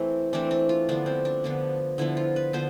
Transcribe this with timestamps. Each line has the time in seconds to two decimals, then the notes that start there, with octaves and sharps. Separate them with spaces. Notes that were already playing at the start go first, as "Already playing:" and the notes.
Already playing: E3 A3 C4
0.33 E3 A3 C4 D4
0.51 D4
0.69 F4
0.89 D3 F3 B3 D4
1.06 C4
1.25 D4
1.44 D3 F3 B3
1.98 D3 F3 B3 E4
2.17 F4
2.36 B4
2.53 D3 F3 B3 C5